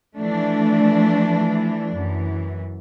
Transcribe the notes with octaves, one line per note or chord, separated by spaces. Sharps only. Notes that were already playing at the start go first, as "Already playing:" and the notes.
E3 F3 A3 D4
F#2 E3